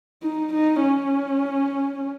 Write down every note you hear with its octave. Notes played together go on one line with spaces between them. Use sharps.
D#4
D#4
C#4